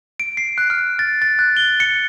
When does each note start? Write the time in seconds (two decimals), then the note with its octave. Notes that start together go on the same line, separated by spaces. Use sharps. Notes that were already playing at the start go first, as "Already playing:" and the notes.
0.20 D7
0.37 C7
0.58 F#6
0.70 F6
0.99 A6
1.22 A6
1.39 F#6
1.57 G7
1.80 C#7